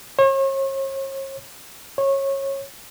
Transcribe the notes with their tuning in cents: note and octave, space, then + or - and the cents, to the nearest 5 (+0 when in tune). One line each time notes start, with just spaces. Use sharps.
C#5 -40
C#5 -20